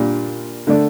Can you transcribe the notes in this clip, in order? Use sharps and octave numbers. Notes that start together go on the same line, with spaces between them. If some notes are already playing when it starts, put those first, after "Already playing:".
Already playing: A#2 G3 D4 F4
D3 A3 D4